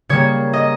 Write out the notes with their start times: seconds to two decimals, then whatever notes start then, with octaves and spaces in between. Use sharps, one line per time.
0.09 C#3 G3 A#3 C#5
0.53 D#5